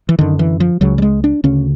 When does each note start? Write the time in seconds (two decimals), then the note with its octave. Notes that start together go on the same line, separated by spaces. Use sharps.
0.09 E3
0.19 F#2 D3 D#3
0.39 E3
0.60 F3
0.81 C#2 C#3 F#3
0.98 G3
1.02 G#3
1.24 D4
1.44 D2 C#3 C#4